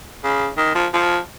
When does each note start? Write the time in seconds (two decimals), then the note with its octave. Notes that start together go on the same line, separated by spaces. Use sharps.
0.24 C#3
0.57 D#3
0.75 F3
0.93 F3